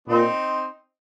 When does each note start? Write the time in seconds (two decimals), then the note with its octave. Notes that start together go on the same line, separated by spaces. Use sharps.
0.08 A#2 C4 D#4